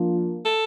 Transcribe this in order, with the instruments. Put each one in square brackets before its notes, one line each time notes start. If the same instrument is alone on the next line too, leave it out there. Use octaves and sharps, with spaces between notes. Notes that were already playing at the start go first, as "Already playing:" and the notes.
Already playing: [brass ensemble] F3 A#3 D4 F4
[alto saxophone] A4